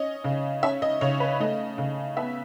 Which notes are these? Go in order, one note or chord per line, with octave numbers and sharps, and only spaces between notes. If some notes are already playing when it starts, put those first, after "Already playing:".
Already playing: C#4 D#5
C#3
C#4 E5
D#5
C#3 C#5
B4
A3 D#5
C#3
B3 E5